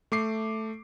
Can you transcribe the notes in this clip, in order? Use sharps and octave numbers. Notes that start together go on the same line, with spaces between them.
A3 D6 C7